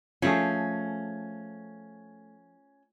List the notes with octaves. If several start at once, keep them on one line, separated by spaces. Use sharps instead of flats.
F3 A3 C#4 G#4